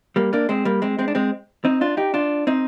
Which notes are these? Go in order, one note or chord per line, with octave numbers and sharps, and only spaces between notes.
G3 A#3
A#3 D4
G#3 C4
G3 A#3
G#3 C4
G#3 C4
D4
G#3 C4
C4 D#4
D4 F4
D#4 G4
D4 F4
C4 D#4